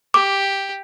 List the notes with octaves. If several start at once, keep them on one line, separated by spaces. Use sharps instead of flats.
G4 D6